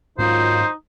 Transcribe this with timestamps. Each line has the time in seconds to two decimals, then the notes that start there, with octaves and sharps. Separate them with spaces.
0.18 G#2 D#3 F#3 C#4 D#4 F4 C5